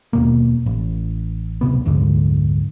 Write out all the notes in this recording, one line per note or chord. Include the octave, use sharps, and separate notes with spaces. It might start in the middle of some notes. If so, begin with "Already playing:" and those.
D#2 B2 A#3
A1
D1 C#2 C3 B3
F1 D2 G#2 D3